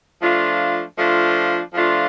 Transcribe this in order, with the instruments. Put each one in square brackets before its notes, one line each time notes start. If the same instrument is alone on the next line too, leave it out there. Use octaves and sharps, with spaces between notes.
[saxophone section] F3 A3 D4 F4
F3 A3 D4 F4
F3 A3 D4 F4